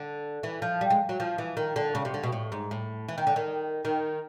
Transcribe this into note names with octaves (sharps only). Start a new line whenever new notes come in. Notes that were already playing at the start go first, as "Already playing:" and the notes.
Already playing: D3
E3
F3
G3
G#3
F#3
F3
E3
D#3
D3
C#3
C3
D3
B2
A2
G#2
A2
E3
D#3
D3
D#3
D#3